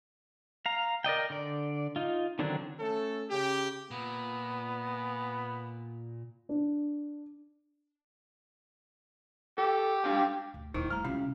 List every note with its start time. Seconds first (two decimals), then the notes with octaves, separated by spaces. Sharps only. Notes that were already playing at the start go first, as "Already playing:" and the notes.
0.66 F5 A#5
1.04 A#4 D5 D#5 G5
1.30 D3 D5
1.96 D#4 F4
2.39 D3 D#3 F#3 C4 D4
2.79 A3 C#4 A4
3.30 C#3 G4
3.91 A#2 B3
6.49 D4
9.58 G4 A4
10.04 D4 F5 G5
10.54 D2
10.74 D#1 A#2 D#3 D#4 E4 C5
10.90 G3 A3 A#5 F6
11.05 C#2 C3 C#4 F4 G4 F5